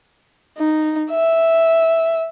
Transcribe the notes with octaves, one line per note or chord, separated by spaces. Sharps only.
D#4
E5